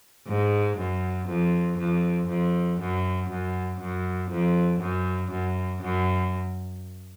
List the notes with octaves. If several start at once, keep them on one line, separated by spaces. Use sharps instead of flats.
G#2
F#2
F2
F2
F2
F#2
F#2
F#2
F2
F#2
F#2
F#2